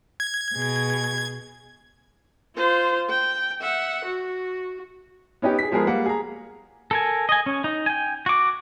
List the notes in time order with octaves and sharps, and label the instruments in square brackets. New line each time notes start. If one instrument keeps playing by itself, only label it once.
[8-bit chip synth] G#6
[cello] B2 G#4
[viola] F4 C5
G5
E5 F#5
F#4
[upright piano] B3 C#4 D#4 G4
G#4 B6
F3 G#3 B3 G#4 A#4
G3 A#3 F#5
G#4 A#5
[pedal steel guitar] A4 A#4 G#5
D#5 G#5
C#4
D#4
G5 G#5
F#4 D6